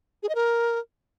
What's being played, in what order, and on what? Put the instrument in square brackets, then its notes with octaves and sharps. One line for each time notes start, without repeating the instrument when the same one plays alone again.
[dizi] G#4
D#5
A#4